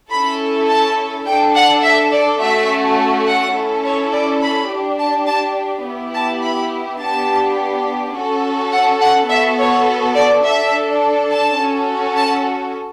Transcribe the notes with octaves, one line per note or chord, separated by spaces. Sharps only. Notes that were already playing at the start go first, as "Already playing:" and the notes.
C#4 E4 A4 B5
A5
D4 A4 G5
F#5
E5
D5
A3 C#4 F#4 A4 E5
F#5
C#4 E4 A4
C#5
D5
B5
D4 G4
A5
A5
B3 E4 G4
A5
B5
B3 D4 G4 A5
C#4 F#4 A4
F#5
F#5
B3 F#4 A4 E5
C#5
D5
D4 A4 E5
A5
C#4 F#4 A4
A5